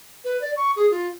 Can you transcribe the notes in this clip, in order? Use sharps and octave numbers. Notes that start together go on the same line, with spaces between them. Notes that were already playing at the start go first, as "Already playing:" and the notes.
B4
D5
C#6
G#4
F4